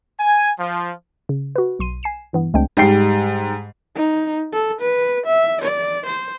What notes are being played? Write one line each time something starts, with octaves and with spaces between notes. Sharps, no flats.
G#5
F3
C#3
F#4 B4
B1 C6 D#7
G#5 C7 E7
G2 E3 B3
C#2 G#3 A3 C4 D4 G5
G#2 G3 G5 C7
D#4
A4
B4
E5
D5
C5